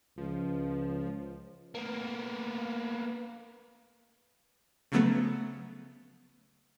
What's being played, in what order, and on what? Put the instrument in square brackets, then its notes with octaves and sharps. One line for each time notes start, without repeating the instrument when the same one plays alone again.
[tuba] C#2 [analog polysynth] F3
[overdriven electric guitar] A#3 B3
[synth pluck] C#3 F3 F#3 A3 B3